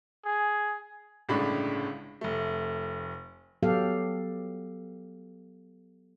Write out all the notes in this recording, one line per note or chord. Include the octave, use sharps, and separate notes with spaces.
G#4
G1 A2 C#3 G#3 D4 B5
F1 A3
F#3 B3 G4 A4 F5